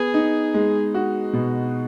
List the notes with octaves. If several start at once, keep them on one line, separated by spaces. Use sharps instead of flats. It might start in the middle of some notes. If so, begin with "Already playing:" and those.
Already playing: B3 G#4
D#4
G#3
F#4
B2